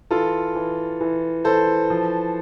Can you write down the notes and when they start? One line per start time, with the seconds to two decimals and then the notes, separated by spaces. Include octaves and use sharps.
0.11 E3 F4 A4
0.55 E3
1.01 E3
1.44 E3 A4 C5
1.90 F3